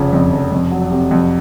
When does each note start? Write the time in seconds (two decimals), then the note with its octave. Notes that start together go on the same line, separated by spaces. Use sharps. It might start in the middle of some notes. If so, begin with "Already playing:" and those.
Already playing: F1 C#3 F3
0.13 F2
0.32 F1
0.52 F2
0.71 F#3
0.91 C3
1.11 F2